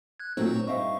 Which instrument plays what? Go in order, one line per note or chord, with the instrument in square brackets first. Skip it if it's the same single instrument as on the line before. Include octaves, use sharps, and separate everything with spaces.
[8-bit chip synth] F#6 G#6
[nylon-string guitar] A#2 F#3 A3 [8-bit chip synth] C4 D#4 C5
[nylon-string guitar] C#5
[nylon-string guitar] G2 C4 D#4 [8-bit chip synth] E5 F5 C#6